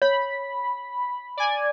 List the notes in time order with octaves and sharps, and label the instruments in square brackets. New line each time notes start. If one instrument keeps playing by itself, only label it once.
[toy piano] C#5 [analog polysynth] B5
[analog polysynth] D5 G#5